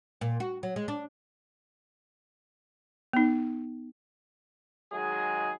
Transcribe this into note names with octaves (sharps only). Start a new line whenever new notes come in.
A#2
F#4
F#3
G#3
D4
B3 D#4
D#3 F#3 G#3 G#4